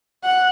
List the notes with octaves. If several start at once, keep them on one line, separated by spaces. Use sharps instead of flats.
F#5